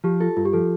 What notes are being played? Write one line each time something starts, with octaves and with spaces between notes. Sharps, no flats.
F3 G4
F4 A4
G2 F4
G4
F3 A4